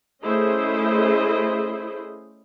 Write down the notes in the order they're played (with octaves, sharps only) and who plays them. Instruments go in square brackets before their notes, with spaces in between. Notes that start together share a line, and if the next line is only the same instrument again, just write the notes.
[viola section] A3 C#4 E4 G#4 C5 D#5